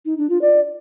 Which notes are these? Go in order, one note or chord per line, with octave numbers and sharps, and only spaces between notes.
D#4
D4
F4
D5